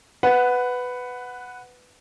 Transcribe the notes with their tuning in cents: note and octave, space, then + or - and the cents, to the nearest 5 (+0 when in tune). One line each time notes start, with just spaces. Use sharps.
B4 +10 F#5 -5